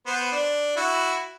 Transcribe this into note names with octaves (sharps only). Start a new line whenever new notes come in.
B3 C5
D4
E4 F#4